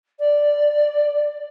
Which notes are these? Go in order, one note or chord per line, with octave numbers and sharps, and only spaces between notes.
D5